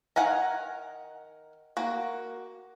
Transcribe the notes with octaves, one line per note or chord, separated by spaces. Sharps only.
D#3 F5 F#5 G#5 A#5
A#3 F#4